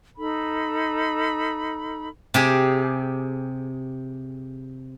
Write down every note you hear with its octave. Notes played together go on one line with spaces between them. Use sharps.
D#4 A4 B5
C3 G4 G#4